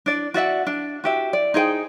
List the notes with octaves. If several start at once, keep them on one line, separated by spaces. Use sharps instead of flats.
D4 D5
F#4 D5 E5 F#5
D4
F#4 G4 E5
D5
D#4 G#4 C5 G5